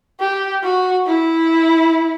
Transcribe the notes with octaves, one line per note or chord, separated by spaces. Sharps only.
G4
F#4
E4